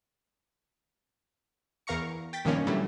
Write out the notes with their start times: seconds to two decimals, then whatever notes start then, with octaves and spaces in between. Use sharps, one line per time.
1.87 E2 A#4 F5 A#5 C#6 C#7
2.33 G5 A6 B6
2.45 G2 B2 D#3 F3 A#3 C#4
2.67 A2 D3 E3 F#3 G3 A3